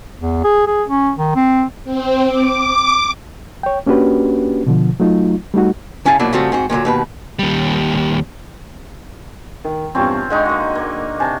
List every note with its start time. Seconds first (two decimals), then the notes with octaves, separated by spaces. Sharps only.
0.17 E2
0.44 G#4
0.67 G#4
0.88 C#4
1.18 D#3
1.36 C4
1.84 C4
2.27 D6
3.63 C#5 G5
3.86 A#3 C#4 D4 F#4 G4 B4
4.67 B2 D3 F3
5.00 F#3 A3 D#4 F4
5.54 G3 A3 D#4 F#4
6.05 C#3 C#4 E4 F5 A5
6.19 B2 F3 F#3 A#3 D4 E4
6.33 C#3 F3 G3 A3 C4 F#4
6.52 G#2 C4 F#4
6.70 A#2 D3 F3 F#3
6.85 D#2 B2 B4
7.39 D#2 G3
9.64 D#3
9.95 E2 G2 C3 C4 C#4 F4
10.30 D3 G#3 D#4 D#5 G5 C#6
10.45 A#3 F#4
10.75 A#3
11.20 C3 G#5 A5